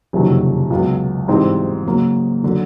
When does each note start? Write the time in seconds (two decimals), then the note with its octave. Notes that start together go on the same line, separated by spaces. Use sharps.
0.13 F#1 F2 C3 D#3 F#3
0.70 C#2 B2 F#3 B3
1.28 G#2 E3 G3 C4 D#4
1.85 C#3 F#3 A#3
2.44 D3 F#3